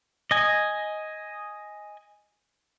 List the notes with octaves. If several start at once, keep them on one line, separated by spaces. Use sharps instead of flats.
D#5 G#5